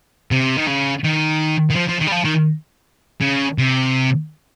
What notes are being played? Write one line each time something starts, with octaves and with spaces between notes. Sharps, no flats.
C3
D#3
C#3
D#3
D#3
F3
F3
D#3
G3
F3
D#3
C#3
C3